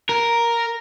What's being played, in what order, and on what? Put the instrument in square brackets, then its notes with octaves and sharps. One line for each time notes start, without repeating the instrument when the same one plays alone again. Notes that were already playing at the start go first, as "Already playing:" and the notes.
[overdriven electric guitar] A#4